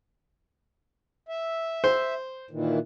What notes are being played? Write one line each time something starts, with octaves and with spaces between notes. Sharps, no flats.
E5
C5
A#2 D#3 E3